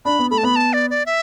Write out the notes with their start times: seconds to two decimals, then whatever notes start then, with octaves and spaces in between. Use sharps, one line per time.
0.05 D4 B5
0.19 B3
0.31 A3 B5
0.38 A5
0.43 B3 B5
0.56 A5
0.73 D5
0.90 D5
1.06 E5